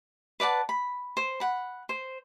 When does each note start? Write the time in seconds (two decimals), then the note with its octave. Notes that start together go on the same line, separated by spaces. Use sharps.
0.40 B4 D5 F#5 A5
0.69 B5
1.17 C5
1.40 F#5 B5
1.89 C5